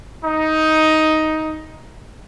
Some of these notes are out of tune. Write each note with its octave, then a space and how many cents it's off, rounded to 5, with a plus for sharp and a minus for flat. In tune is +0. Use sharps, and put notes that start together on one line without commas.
D#4 +10